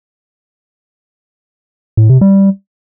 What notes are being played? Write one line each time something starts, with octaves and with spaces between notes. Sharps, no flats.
A2
C3
G3